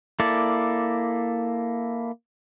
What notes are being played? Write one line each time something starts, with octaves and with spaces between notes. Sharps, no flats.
A#3 E4 A4 D5